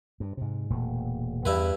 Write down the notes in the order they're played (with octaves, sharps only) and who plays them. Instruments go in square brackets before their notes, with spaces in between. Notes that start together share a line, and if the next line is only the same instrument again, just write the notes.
[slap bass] G2
G#2 C3
E1 A#2 A3
[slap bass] E2 [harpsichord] G2 E4 B4